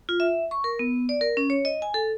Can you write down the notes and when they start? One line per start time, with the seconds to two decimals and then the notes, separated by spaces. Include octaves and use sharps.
0.09 F4
0.20 E5
0.51 C#6
0.64 A#4
0.79 B3
1.09 D5
1.21 A#4
1.37 C#4
1.50 C#5
1.65 D#5
1.82 G#5
1.94 A4